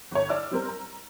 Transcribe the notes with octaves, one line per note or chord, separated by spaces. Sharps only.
G1 C#5
D5 E6 F6
G3 C4 A#4
A#5